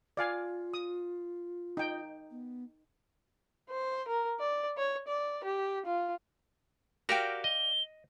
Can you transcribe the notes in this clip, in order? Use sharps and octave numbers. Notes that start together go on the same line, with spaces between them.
F4 D5 F5 G#5
D#6
D#4 G5
B3
C5
A#4
D5
C#5
D5
G4
F4
F#4 G4 A#4 D5 F5 G5
D#5 G7